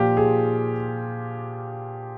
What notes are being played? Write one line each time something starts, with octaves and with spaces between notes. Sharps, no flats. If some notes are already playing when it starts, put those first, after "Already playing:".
Already playing: A#2 F3 F4 G4
G#4